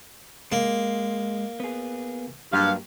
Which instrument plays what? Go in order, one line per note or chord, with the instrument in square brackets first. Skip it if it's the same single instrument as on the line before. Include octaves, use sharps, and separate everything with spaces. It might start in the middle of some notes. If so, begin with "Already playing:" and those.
[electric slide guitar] G#3 [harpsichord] A#3
[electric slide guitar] B3 G#4
[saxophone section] G2 F5 [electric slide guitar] F#3 A#3 G4